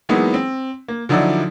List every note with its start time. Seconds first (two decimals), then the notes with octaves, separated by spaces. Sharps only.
0.09 E3 F#3 G#3 A#3 B3 D#4
0.34 C4
0.88 A#3
1.09 D3 F3 F#3 D#4 E4 D5